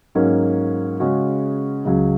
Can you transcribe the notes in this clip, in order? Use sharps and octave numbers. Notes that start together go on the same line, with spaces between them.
G#2 F#3 A#3 C#4 F#4
C#3 G#3 C#4 F#4
C#2 C#3 F#3